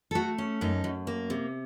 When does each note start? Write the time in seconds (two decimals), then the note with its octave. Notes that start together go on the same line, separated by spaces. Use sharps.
0.11 A4
0.15 A3 F#4
0.38 C#4
0.61 F#2 D#4
0.84 F#2
1.07 A#3
1.30 C3